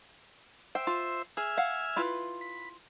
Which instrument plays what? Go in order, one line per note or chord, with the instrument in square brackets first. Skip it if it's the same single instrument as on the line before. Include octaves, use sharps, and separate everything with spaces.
[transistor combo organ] C5 E5 [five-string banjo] G5
[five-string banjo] F4
[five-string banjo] G#4 [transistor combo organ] E5 G#5 F6
[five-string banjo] F5 F#5
E4 F4 B4
[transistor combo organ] B5